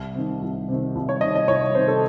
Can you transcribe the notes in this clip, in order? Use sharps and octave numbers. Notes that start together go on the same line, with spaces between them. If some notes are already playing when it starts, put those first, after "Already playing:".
Already playing: C2
C3 D#3
C2
C3 D#3
C2
C#5
C3 D#3 D#5
D#5
C2 C#5
C3 D#3 C5
A4